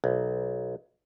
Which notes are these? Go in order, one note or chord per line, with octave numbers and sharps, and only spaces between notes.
B1